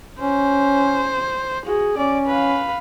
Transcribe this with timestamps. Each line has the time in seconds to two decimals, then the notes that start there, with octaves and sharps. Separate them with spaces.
0.20 C#4 C5
1.66 F#4 G#4
1.97 C#4 D5
2.27 B4 F5